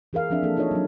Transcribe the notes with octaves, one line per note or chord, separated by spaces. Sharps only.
E3 G#4 A#4 F5
F3 C4 D4 G#4 E5
A#3 A4
D4 D#4 F4 A4 C#5 D#5
F#3 D4